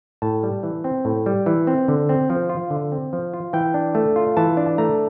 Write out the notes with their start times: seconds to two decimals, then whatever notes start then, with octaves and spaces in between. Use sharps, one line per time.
0.22 A2 A5
0.43 G3
0.63 E3
0.84 C4
1.05 A2
1.26 G3
1.46 E3
1.67 C4
1.88 D3
2.09 C4
2.30 F3
2.49 F4
2.70 D3
2.92 C4
3.13 F3
3.34 F4
3.53 E3 G5
3.74 D4
3.95 A3
4.16 F4
4.37 E3 A5
4.57 D4
4.78 A3 A#5